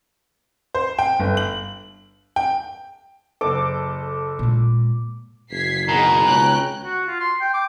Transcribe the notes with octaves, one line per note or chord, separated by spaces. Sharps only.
C5
G5
G1
F#7
G5
F#1 A4 D6
A#2 G#3
F#1 G#6 B6 C7
B2 D#3 G#4 A#5
C#2 C#4 G5 F#6
F#4
F4
C6
G5
D6